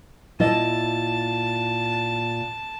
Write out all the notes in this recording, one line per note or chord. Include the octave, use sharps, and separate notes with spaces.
A#2 E4 D#5 A5